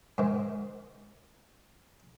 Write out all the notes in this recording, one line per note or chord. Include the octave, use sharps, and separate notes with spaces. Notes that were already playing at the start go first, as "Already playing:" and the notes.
G#2 D#3